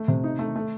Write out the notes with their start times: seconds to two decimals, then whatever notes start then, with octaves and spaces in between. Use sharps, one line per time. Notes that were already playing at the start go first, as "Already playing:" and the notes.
Already playing: A3
0.08 C3
0.24 D#4
0.39 A3
0.56 A3